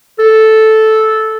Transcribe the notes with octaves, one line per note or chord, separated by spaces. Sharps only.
A4